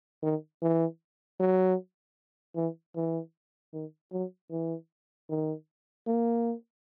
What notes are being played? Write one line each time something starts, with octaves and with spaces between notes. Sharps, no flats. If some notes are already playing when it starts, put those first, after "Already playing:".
D#3
E3
F#3
E3
E3
D#3
F#3
E3
D#3
A#3